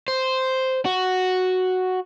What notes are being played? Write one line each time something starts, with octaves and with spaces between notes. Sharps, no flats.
C5
F#4